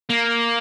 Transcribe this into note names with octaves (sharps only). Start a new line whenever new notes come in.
A#3